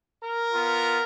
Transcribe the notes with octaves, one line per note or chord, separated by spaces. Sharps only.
A#4
B3 F4